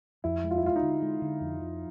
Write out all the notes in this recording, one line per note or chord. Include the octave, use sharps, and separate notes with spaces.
F2 E4
G#3
F4
E4
G#3 F4
D#4
D3
G#3
D3
F2
F3